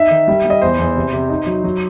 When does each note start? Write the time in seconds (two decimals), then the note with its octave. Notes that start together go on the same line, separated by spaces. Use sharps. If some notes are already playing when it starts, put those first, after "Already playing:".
Already playing: D#4 E5
0.11 D#3
0.28 G3
0.45 G3
0.50 D#5
0.62 E2 C5
0.79 E2
0.95 C3
1.13 C3
1.29 D#4
1.47 F#3
1.64 F#3